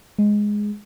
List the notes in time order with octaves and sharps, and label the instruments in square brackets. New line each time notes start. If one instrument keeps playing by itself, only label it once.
[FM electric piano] G#3